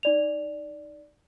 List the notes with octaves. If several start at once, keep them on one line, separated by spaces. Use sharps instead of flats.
D#4 D5 F7